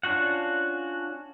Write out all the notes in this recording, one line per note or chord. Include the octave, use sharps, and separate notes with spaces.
C#4 D4 F4 F#4 F#5